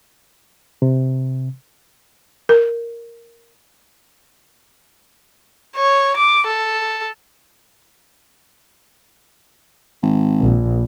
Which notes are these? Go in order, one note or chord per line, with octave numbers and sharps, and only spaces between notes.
C3
A#4
C#5
D6
A4
G#1
A#1